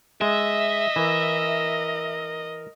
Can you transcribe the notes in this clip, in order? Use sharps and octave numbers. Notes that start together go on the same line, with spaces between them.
G#3 D#5 E5
E3 A#4